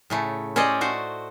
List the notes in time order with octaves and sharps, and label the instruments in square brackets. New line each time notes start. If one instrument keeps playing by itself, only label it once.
[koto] A2 C#3 A3
C#4 G4 C5 D5 D#5
A3 F#4 C5